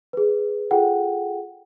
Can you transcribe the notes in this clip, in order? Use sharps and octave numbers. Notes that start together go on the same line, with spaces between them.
G#4 B4
F4 G#4 A4 F#5 G5